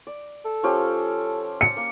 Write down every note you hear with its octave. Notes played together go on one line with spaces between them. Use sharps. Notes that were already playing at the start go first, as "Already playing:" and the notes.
D5
A4
F3 C#4 G4
E6 C#7
A#3